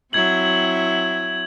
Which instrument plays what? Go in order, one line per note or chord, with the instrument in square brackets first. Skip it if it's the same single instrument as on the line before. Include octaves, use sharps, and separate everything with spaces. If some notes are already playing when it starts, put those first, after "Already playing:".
[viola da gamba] F#3 C4 E4 [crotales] G#6 F#7